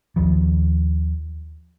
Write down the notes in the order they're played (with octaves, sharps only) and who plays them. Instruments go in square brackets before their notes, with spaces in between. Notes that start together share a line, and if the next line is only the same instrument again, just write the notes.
[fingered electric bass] D#2 D#3 F3